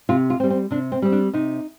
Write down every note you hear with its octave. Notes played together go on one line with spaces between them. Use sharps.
C3 F4
F4
C4
G3
C4
C3 D4
C4
G3 C4
D4
C3 D#4